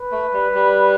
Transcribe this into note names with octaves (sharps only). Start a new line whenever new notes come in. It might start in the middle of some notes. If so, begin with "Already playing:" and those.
Already playing: B4
A3
G3
G3